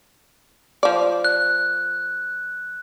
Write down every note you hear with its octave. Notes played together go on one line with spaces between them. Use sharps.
F3 D5
F#6